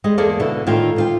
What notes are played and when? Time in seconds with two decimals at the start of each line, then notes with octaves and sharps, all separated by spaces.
0.04 G3 G#3 D#5
0.18 E2 A#3 G#4 A4 D5 F5
0.40 B2 D3 D4 E4
0.67 A2 D#3 F4 G5
0.96 D2 F4 G5